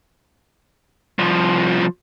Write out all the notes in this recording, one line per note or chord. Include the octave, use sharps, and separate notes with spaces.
C2 F3